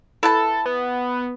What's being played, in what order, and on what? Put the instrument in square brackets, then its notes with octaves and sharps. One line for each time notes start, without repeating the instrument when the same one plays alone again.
[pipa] E4 B4 A5 [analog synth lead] A4
[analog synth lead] B3